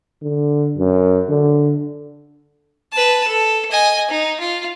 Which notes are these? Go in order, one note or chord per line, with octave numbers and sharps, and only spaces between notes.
D3
F#2
D3
B4 A5
A4
D#5 G#5
D#4
F4